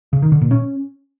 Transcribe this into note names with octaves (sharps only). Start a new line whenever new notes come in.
C#3
D#3
D3
A#2
C#4